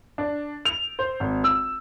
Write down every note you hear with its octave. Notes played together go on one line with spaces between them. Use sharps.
D4
F7
C5
G#1
E6